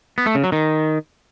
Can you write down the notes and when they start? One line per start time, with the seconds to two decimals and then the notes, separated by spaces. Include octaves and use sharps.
0.18 B3
0.26 A3
0.35 C#3
0.44 F#3
0.52 D#3